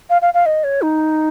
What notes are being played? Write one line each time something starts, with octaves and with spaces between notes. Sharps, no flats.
F5
F5
F5
D#5
C#5
D#4